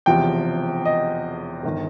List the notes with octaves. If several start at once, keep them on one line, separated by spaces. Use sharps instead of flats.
E1 E2 C3 F3 G5
D#5
G1 D#3